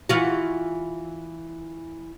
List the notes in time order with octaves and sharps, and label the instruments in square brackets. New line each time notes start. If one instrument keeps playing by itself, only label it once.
[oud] E3 F4 F#4